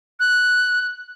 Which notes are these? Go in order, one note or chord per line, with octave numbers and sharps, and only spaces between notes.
F#6